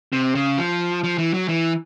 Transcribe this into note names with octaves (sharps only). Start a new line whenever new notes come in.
C3
C#3
F3
F3
E3
F#3
E3